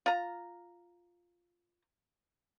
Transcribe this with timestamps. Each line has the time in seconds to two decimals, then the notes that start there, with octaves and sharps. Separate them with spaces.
0.06 F4 A#5